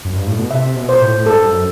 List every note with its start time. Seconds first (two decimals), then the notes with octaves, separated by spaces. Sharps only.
0.05 F#2
0.16 G2
0.27 A2
0.38 B2
0.50 C3 E5
0.76 B2
0.89 C5
1.01 A2
1.26 G2 A4
1.45 F#2